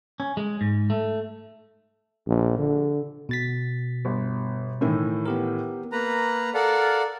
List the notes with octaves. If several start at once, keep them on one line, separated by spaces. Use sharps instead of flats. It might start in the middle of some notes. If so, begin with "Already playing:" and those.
C#4
G#3
G#2
A3
A#1
D3
B2 A6 B6
G1
A2 D#3 E3
B3 G4 A#4
A#3 B4 A#5
A4 A#4 D5 F5 F#5